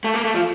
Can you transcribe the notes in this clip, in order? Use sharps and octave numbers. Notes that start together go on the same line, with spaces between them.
A3
A#3
A3
F3